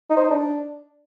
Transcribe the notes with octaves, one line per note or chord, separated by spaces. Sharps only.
D#4
C5
D#4
D4